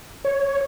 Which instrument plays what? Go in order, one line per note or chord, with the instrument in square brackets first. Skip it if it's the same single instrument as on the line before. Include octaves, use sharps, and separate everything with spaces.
[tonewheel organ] C#5